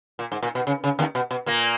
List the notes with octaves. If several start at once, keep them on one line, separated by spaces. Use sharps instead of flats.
A#2
G#2
A#2
B2
C#3
C#3
D#2 D#3
B2
B2
A#2 A#3